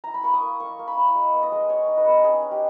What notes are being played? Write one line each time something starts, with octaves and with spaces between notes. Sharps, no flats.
E4 A#5
B5
A#3 C#6
D#6
A#3
A#3 C#6
A#3
B5
E4
G#3
B3
D#5
G#3
G#3 C#5
D#4
B4
G#3
C#4 G#4
C#4
G4